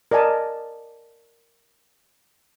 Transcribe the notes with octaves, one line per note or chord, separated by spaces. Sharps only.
A#4 D5 D#5 G#5 A5